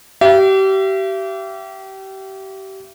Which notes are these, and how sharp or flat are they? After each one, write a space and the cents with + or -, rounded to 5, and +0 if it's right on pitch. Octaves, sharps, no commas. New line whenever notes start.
G4 -30 E5 +40